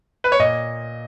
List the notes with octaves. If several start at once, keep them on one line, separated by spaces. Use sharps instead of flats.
B4
C#5
A#2 D#5